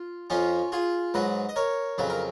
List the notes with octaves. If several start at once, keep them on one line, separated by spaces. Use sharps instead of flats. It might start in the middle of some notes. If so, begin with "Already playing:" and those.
Already playing: F4
F2 F3 C#4 F4
F4 G#4
G#2 F#3 B4 D#5
D#5
A#4 C#5
F2 C#3 F#3 B4
A#4